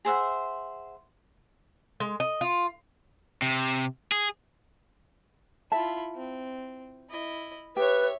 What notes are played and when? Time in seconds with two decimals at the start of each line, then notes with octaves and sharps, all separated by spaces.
0.05 G#4 C5 E5 F#5
2.00 G#3
2.20 D#5
2.41 F4
3.42 C3
4.12 G#4
5.72 E4 F4 E5 A5
6.15 C4
7.10 E4 D#5
7.77 G4 B4 C#5 E5